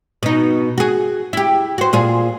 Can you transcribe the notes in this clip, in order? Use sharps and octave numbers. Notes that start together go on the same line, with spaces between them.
B2 D#4
F#4 G#4
E4 G4
F#4 C5
A#2 F4 G#4